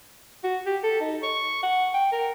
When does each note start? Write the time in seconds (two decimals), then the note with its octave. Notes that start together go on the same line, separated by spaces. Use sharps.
0.44 F#4
0.66 G4
0.83 A4
1.01 D#4
1.23 C#6
1.63 F#5
1.94 G5
2.12 A#4